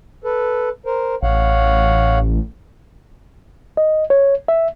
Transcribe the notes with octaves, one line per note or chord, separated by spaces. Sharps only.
A4 B4
A#4 C5
A1 C#5 F5 F#5
D#5
C#5
E5